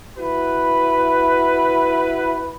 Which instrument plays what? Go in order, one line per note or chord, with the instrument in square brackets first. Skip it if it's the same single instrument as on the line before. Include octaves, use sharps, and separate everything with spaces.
[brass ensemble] E4 F#4 B4